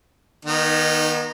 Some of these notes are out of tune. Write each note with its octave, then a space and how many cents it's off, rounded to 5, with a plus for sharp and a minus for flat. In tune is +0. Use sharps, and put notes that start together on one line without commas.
D#3 +0 B3 -45 D#4 -20